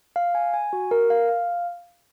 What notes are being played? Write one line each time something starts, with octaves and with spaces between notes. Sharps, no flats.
F5
G#5
G#5
F#4
A#4
F5
F5